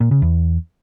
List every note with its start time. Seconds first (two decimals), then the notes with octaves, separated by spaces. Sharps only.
0.01 A#2
0.11 C#3
0.22 E2